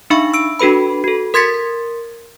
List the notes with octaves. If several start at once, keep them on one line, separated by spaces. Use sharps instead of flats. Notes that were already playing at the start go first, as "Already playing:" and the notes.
D4 D#4 E5 F5 B5 C#6
E6 D7
D4 F#4 A4 B4 B5
F#4 A4
A#4 C6 G#6 A6 B6 C#7